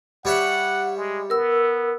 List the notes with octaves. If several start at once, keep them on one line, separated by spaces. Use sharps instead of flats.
G3 C#5 E5 F#5
G#3
B3 A#4 E6